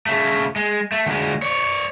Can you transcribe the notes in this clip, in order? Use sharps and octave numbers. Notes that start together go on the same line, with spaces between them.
C#3 A3
G#3
A3
D2 G#3
C#5 D5